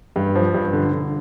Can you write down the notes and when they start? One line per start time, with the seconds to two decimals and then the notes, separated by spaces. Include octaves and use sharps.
0.16 G2
0.35 F3
0.54 G2
0.73 D3
0.92 D3